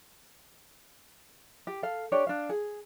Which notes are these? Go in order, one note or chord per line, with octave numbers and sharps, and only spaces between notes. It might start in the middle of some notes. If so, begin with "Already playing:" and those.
G4
A4 F5
D4 G4 C#5 D5
D4 F5
G#4